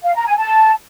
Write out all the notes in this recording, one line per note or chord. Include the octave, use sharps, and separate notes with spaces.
F5
A#5
G#5
A5